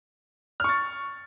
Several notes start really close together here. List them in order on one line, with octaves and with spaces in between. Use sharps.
F6 C#6 A6